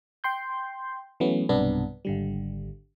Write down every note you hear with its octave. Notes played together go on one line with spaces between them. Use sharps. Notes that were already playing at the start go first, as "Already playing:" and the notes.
G5 C6 G6
E3 F#3 A3 B3 C#4
B1 G2 C3 B3 D4
G#1 D3 G3